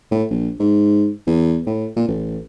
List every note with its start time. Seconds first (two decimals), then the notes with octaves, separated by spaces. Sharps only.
0.11 A2
0.30 A#1
0.60 G#2
1.27 E2
1.66 A2
1.96 A#2
2.08 A1